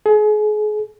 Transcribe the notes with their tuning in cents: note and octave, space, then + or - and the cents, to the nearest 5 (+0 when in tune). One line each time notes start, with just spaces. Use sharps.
G#4 +35